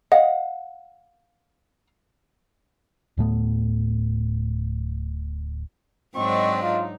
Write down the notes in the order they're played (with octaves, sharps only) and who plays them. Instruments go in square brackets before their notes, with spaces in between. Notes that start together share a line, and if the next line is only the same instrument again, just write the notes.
[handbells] D#5 [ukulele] F5 F#5
[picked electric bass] D1 A2 A3 B3
[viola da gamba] G#2 F#3 D4 [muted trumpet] C4 [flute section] D#5 [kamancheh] C#6
[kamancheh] D#4 [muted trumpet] F4